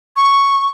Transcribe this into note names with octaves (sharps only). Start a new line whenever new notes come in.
C#6